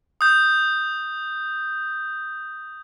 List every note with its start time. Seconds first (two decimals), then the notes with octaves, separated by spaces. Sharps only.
0.21 D#6 G6